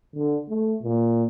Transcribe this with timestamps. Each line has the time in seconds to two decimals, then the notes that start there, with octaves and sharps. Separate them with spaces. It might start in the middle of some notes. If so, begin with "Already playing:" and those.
0.16 D3
0.49 A3
0.82 A#2